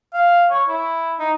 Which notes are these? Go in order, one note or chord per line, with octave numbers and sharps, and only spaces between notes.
F5
C#5
E4
D#4